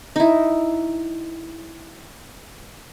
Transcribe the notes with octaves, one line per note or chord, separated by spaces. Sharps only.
D#4 E4